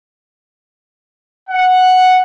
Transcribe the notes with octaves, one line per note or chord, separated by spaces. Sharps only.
F#5